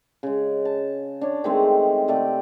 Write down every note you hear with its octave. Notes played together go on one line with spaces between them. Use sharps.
C#3 G#3
A5
D4 C#5
D#3 G#3 A3 C4
C3 A3 D5 G5